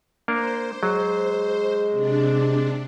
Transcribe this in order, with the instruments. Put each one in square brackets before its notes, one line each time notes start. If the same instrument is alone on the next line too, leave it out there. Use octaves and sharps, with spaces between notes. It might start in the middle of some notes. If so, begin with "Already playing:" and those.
[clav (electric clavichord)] A#3 D4 A#4 [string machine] C5
[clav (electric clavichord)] F#3 [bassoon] G#3
[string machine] C3 D4